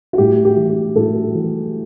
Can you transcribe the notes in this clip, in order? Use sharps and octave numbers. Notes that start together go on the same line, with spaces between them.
F#4
A2 G4
G4
E3
G4
A2 F#4 A4
E3